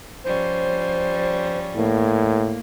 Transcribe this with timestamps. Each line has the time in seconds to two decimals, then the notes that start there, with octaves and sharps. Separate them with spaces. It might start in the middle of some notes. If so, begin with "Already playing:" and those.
0.24 F3 G3 C#4 C5
1.76 A2 A#3